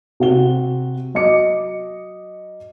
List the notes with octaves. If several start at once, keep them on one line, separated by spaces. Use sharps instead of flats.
C3 F#4 G7
F#3 D#5 D6 C#7